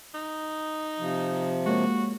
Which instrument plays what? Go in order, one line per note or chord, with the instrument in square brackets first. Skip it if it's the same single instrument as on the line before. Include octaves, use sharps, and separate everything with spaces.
[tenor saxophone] D#4
[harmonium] C3 F3
[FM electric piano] G#3 A#3 C#5 [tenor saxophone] F#4